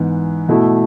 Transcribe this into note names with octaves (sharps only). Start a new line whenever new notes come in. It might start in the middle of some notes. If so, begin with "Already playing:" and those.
Already playing: G#2 E3 B3
B2 A3 E4